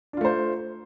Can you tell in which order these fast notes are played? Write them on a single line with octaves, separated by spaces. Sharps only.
D4 F4 A3 C5